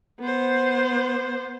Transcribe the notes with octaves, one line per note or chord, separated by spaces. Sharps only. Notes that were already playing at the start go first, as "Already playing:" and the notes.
B3 C5